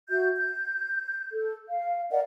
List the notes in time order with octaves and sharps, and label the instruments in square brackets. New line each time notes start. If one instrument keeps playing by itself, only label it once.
[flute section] F#4 E5 G6
G6
A4
F5
A#4 D5 D#5 F#5